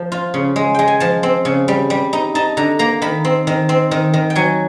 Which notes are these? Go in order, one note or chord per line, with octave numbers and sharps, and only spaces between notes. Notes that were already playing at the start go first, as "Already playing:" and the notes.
Already playing: F3
F4
C#3
G#3
G#3 G5
G#5
F3 A5
C4
C#3
G3
G3
D#4
D#4 A5
D3 A#5
A#3 A#5
D#3 B5
C4
D#3
C4
D#3
D#3
G5
F#3 G#5